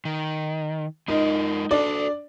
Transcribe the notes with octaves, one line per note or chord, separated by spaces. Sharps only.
D#3
G#3 D#4 F4 A#4
D4 F#4 A4 D5